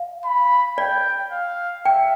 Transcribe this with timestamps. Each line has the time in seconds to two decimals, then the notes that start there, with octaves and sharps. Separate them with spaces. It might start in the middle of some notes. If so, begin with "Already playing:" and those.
Already playing: F5
0.25 B5
0.78 D5 G5
1.31 F5
1.85 E5 G5